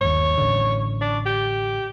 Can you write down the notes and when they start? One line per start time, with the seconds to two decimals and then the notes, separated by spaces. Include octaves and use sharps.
0.01 G1 D#2 C#5
0.38 A1 D3
1.01 D4
1.26 G4